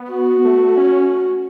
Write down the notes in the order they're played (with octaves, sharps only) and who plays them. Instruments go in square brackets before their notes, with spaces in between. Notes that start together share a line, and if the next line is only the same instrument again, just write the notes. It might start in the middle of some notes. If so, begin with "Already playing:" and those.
Already playing: [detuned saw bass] B3
[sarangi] F#4
[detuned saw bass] A3
C#4